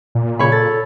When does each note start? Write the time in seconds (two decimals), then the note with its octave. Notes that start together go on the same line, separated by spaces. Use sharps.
0.15 A#2
0.39 C#3 C#5 B5
0.52 A4 A6